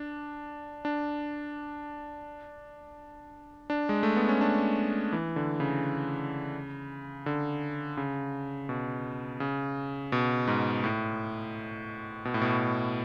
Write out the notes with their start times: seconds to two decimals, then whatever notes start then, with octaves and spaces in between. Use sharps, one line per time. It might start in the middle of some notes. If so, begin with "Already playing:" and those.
Already playing: D4
0.85 D4
3.70 D4
3.89 G#3
4.03 A3
4.16 B3
4.29 C#4
4.41 D4
5.13 E3
5.36 D3
5.60 C#3
7.26 D3
7.97 C#3
8.69 B2
9.40 C#3
10.12 B2
10.47 G#2
10.84 A2
12.25 B2
12.34 A2
12.42 B2